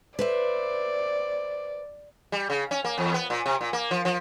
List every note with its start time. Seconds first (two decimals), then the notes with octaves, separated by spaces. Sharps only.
0.19 B4 C5 D5 E5
2.32 G3
2.50 C#3
2.71 C#4
2.84 A#3
2.98 E2
3.14 B3
3.30 A#2
3.46 C3
3.61 A#2
3.73 A#3
3.91 F3
4.05 F3